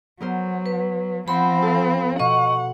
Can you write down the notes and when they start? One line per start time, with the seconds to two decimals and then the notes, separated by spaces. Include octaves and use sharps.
0.20 F#3 B3 A#4 C5
0.66 B4
1.28 F3 C4 C5 F#5 B5 C6
1.62 A4 F5
2.19 B2 D#5 F#5 C#6